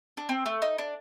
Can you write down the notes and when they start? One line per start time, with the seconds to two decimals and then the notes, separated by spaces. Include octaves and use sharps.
0.17 D4
0.29 C4
0.46 A3
0.62 D#4
0.78 D4